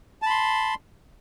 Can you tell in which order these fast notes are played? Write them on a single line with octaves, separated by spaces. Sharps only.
A5 B5 C6